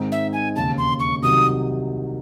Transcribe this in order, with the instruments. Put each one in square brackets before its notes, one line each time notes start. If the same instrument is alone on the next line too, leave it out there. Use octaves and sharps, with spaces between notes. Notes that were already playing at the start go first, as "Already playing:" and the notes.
Already playing: [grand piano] G#2 D#3 G#3 C4 D#4
[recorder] E5
G#5
[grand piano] E1 D#2 C#3 [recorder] A5
[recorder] C6
C#6
[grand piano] C2 C3 D#3 F#3 [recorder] D#6